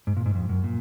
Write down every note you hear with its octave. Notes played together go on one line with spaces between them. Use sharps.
G#2
A#2
G#2
F2
F#2
A#2